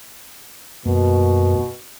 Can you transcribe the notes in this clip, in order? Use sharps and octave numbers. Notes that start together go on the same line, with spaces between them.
F#2 B2 A#3